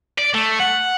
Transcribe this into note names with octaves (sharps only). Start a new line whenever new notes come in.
D5
A3
F#5